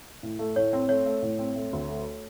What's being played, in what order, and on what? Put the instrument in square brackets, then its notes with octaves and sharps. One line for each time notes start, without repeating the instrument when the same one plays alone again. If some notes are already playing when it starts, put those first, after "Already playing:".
[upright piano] A2
A3
[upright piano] A2 [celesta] C#5
[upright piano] C4
[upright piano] A3 [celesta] C#5
[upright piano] A3
A2
C4
A3
D2
A3